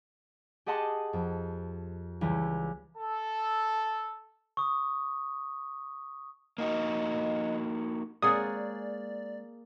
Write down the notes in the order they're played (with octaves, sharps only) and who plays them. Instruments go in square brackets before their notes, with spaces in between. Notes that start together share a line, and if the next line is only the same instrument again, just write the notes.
[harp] G4 G#4 D#5 F#5 A5 C6
F2
C#2 E3 G3
[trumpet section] A4
[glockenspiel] C#6 D#6
[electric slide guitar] A#3 D#4 F#4 [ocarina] D#5
[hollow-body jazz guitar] G#3 C4 C#5 [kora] A#3 G#4 F#5 [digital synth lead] D5 [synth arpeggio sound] D#6